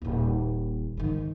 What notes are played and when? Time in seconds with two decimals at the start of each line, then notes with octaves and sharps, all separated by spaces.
0.02 D#1 A#2
0.97 G#2 D#3